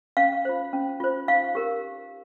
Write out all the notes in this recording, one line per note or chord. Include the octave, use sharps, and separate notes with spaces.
C#4 F5
F4 C5
C#4
F4 C5
D#4 F5
G4 A#4